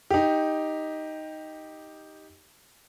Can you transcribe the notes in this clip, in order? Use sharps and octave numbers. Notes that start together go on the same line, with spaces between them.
D#4 G4